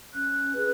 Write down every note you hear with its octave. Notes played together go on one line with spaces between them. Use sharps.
C#4 F#6
G#4 B4